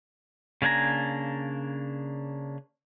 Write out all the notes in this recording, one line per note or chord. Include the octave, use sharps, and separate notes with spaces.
C#3 A#3 D4 G#5 A#5